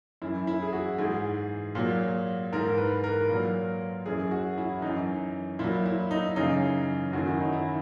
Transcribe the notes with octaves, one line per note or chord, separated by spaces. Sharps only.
F#2 E3 E4
E4
G#4
F#4
G#2 E3 G#4
A#2 F#3
G#2 E3 A#4
B4
A#4
A#2 F#3
F#2 E3 G#4
F#4
E4
F#2 E3 D#4
A#2 F#3 E4
E4
D#4
F#2 C#3 E3 D#4
F#2 D#3 F#3 F#4
E4
D#4
E4